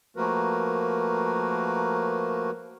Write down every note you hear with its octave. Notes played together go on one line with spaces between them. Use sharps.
F3 A3 A#3 F#4 A#4 B4